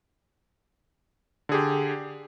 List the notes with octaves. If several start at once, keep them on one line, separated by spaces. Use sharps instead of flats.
D3 G4 G#4